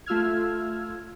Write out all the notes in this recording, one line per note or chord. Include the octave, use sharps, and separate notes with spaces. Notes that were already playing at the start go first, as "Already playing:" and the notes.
A3 F4 E6 F6 G#6